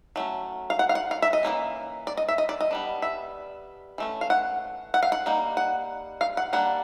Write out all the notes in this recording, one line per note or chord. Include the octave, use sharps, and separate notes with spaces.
F#3 A3 C#4
F5
F#5
F5
F#5
F5
E5
D#5
E3 G3 A#3 C#4
D5
D#5
E5
D#5
D5
D#5
G3 B3 D4
E5
E3 A3 C#4
F5
F#5
F#5
F5
F#5
G3 A#3 D#4
F#5
F5
F#5
G3 A#3 D4 F#5